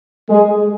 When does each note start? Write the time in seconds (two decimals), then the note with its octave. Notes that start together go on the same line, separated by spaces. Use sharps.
0.29 G#3 G#4